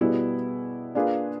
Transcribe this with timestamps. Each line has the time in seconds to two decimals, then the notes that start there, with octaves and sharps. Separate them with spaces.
0.01 B2 G3 B3 E4 G#4
0.95 A#3 D4 F4 G#4 B4